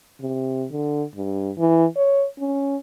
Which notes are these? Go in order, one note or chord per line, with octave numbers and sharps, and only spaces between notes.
C3
D3
G2
E3
C#5
C#4